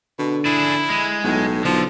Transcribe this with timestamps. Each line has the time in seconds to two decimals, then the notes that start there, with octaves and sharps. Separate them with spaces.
0.19 B2 D3
0.45 D4 E4 G#4
0.90 G#3
1.24 B1 A2
1.65 B1 D3 F3